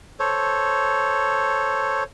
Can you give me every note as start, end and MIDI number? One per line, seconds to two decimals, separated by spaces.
0.20 2.03 69
0.20 2.03 72
0.20 2.03 73